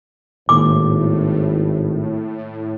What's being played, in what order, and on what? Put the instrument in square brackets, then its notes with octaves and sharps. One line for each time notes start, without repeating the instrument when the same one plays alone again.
[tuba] G#1 [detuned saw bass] A2 [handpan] D#3 A#3 [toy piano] D6